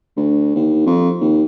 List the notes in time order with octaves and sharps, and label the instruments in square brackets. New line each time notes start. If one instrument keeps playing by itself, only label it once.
[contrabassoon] D2
D#2
F2
D#2